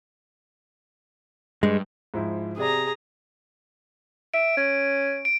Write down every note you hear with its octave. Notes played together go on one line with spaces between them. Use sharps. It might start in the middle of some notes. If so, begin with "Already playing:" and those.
G2 G#3
G#2 F3 E4
C3 G#4 D5 A#5
E5 D7
C#4
D7